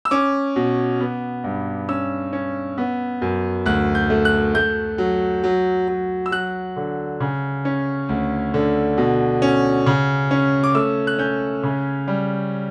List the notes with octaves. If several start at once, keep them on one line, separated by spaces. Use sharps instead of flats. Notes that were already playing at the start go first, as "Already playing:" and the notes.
E6
C#4 D6
B2
B3
G2
C#4 E6
C#4
B3
F#2
D2 F#6
G6
A3
F#6
A3 G6
F#3
F#3
F#3
E6
F#3 F#6
D3
C#3
C#4
D2
D3
B2
C#4
C#3
C#4
D6
A3 E6
F#6
C#4 G6
C#3
G3